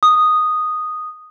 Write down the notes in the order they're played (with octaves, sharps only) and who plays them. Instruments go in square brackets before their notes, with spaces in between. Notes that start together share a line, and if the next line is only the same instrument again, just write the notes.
[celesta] D#6